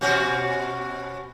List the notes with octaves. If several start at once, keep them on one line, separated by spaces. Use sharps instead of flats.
B2 C#4 F#4